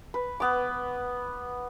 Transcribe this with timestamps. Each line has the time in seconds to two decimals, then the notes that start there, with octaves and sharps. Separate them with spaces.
0.14 B4
0.40 B3 D6